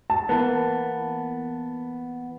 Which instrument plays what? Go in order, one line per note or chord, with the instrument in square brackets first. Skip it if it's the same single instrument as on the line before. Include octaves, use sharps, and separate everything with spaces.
[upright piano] A5
[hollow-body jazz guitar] E3 A#3 B3